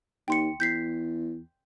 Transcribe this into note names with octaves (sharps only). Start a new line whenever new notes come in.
D#2 G5 C6 C#7
E2 G6 B6 C7